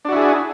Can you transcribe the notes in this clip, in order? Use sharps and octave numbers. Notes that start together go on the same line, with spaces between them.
D4 E4 F#4 G#4